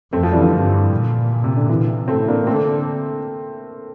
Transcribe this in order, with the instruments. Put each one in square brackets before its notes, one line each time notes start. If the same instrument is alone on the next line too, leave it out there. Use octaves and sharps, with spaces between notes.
[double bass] F2 [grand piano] A3 C4
[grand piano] F3 A3
E3 G3
D3 F3
[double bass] G2
A#2
[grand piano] C3
D3
C3 E3
[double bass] A2 [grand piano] A3 C4
[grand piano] A#3 D4
[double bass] D3 [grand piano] A3 C4